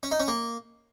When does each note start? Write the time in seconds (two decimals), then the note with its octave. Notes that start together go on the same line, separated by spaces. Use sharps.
0.03 C#4
0.11 D#4
0.20 C#4
0.28 A#3